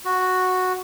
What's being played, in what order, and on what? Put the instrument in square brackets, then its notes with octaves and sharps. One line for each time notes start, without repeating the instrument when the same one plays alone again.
[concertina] F#4